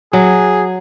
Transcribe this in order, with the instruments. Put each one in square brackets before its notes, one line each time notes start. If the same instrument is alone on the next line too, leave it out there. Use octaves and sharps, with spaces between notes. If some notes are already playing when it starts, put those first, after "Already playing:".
[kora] F#3 [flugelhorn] G#4